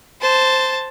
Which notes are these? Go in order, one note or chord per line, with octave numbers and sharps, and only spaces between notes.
C5 A5